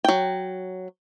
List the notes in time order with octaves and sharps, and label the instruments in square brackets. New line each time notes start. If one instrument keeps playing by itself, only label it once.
[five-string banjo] F#3 G5